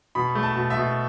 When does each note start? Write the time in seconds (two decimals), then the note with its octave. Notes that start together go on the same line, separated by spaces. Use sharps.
0.15 B2 B5
0.35 A3
0.43 A5
0.56 B2
0.70 E5
0.77 B2